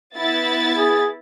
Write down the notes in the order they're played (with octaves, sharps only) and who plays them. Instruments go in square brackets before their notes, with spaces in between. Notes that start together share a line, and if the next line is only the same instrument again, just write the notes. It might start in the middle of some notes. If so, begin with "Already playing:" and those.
[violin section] B3 E4 A6
[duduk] G#4